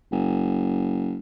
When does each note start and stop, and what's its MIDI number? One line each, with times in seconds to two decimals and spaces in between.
0.12 1.19 30